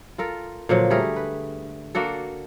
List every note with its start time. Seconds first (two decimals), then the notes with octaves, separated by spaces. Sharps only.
0.18 F4 A4 A#4
0.69 A#2 D3 F3 F#3
0.90 G3 A3 G#4 A#4
1.16 B4
1.95 A#3 D4 F#4 A4